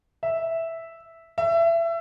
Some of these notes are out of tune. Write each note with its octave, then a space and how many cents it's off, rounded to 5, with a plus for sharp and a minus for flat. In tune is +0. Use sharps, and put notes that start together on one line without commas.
E5 -5
E5 +25